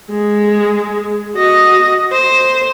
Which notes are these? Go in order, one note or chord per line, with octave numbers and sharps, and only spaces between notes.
G#3
F#4 D#5
C5